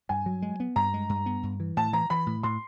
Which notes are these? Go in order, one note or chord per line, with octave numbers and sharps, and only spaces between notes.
G2 G#5
F#3
G#3
B3
G2 A#5
G#3
G2
B3
G2
E3
A2 A5
E3 A#5
E3 B5
A2
A2 C6